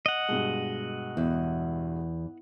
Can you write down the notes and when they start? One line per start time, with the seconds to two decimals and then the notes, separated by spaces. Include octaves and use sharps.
0.06 D#5 F#5
0.29 G2 B2 G#3
1.17 E2